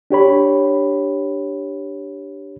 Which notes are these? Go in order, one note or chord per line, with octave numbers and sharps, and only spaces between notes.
D4 G4 C#5 B5